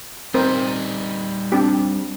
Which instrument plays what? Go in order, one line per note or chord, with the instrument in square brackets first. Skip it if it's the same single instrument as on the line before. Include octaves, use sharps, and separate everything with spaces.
[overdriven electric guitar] G3 D#4 [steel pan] C4 A#4 C5
[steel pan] C4 D4 G4